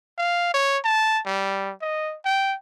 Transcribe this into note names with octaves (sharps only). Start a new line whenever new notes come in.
F5
C#5
A5
G3
D#5
G5